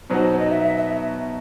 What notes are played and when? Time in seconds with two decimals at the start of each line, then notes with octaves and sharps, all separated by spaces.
0.10 B2 F#3 B3 D#4 F#4 C5
0.39 D#5
0.50 E5
0.63 E5
0.78 E5